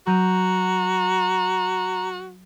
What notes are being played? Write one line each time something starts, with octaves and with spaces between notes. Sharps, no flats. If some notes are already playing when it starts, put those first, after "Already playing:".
F#3 F#4 A#5 G6 D#7